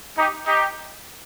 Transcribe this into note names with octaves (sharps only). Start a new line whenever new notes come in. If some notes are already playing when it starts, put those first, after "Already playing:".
D#4 G4
D#4 G4